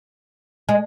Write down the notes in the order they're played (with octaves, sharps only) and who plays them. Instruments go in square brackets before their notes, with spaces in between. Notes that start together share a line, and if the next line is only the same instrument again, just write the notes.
[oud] G#3